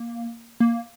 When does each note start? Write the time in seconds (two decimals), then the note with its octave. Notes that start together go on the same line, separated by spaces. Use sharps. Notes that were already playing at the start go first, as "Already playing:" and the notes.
Already playing: A#3
0.60 A#3